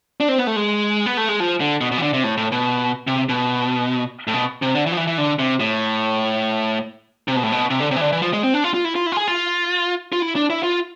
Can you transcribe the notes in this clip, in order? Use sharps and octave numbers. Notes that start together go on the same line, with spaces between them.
D4
C4
B3
A3
G#3
B3
A3
G#3
F3
D3
B2
B2
E3
D3
C3
A2
A2
B2
C3
B2
A2
B2
C3
D3
E3
F3
E3
E3
D3
C3
A2
C3
B2
A2
B2
C3
D3
C3
E3
D3
E3
F3
G#3
C4
D4
F4
F4
E4
F4
E4
F4
G#4
F4
F4
E4
D4
E4
F4